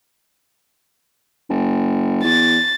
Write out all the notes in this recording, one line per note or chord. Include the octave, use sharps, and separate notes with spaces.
F#1
E2 A6